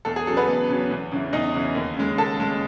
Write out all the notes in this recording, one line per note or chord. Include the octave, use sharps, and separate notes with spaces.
E2 A4
G#4
C#3 F#3 A4
B3 B4
E2
C#3 F#3
E2
C#3 E3
E2 D#4 D#5
C#3 E3
D#2
C#3 G#3
D#2 A4 A5
C#3 G#3